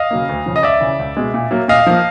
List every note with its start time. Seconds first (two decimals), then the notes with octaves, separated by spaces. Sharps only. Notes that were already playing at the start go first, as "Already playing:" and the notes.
Already playing: D#5 F5
0.11 C#3 F#3 A#3
0.29 D2
0.46 C#3 F3
0.56 D#5
0.63 C#2 D5 E5
0.81 C#3 E3
0.99 C#2
1.17 B2 G#3
1.34 A#2
1.51 F#3 A#3
1.68 A#2 D#5 F5
1.86 F3 A#3